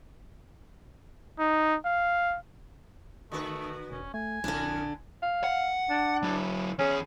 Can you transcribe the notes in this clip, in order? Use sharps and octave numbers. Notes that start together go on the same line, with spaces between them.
D#4
F5
D3 A3 F#4 B4
E1 C#4
A3 G#5
A#1 F2 D3 D4 E4
F5
F#5
D4
F#3 E4
E2 C#4 G#4